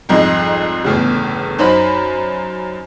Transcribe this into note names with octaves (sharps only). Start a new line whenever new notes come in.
C2 F2 G#2 D#5
G1 E2 A2 C#3
F#2 D#4 C5 B5